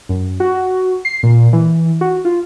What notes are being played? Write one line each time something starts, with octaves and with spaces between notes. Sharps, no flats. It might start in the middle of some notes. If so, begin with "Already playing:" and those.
F#2
F#4
C7
A#2
E3
F#4
F4